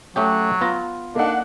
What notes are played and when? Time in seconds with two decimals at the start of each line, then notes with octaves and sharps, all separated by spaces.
0.16 F#3 A3 C#4 G4
0.61 B3 F4 A#5
1.15 A#3 D4 D#4 F#5